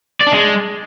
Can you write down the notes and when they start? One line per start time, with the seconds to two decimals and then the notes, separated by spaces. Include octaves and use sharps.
0.21 D5
0.27 D4
0.33 G#3